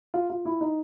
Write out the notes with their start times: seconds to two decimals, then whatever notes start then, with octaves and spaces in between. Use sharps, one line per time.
0.14 F4
0.30 F4
0.45 E4
0.61 D#4